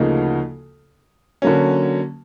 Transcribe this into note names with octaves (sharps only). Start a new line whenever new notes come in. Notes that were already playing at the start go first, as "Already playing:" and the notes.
Already playing: D2 C#3 F3 A#3 D#4
D3 F#3 A#3 C#4